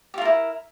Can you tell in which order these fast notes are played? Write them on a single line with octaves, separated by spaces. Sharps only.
G4 F4 A#4 E4